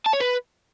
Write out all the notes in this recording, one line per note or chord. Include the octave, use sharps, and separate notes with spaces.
A5
C#5
B4